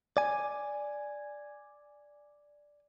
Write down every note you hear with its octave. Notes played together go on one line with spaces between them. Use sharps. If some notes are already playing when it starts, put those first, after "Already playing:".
D5 G#5